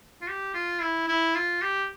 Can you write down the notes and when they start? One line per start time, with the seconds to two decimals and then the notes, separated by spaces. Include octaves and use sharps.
0.22 F4
0.28 G4
0.54 F4
0.82 E4
1.08 E4
1.35 F4
1.62 G4